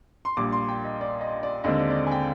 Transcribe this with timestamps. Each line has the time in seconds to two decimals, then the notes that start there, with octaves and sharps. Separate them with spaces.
0.25 C6
0.37 A#1 A#2 G3 D6
0.52 C6
0.68 G5
0.85 D#5
1.01 D5
1.21 D#5
1.43 D5
1.64 D#2 D3 G#3 C4 D#5
1.79 D5
1.90 D5
1.95 D#5
2.07 G#5
2.11 G5